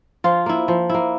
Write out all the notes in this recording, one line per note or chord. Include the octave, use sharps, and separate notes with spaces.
F3 F4
A#3 E4
F3
A#3 E4